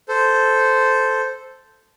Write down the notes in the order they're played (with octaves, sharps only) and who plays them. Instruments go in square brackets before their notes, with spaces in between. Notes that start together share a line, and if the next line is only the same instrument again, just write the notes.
[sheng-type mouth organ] A4 C5